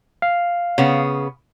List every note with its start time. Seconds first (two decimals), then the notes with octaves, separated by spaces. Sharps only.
0.22 F5
0.78 C#3 B3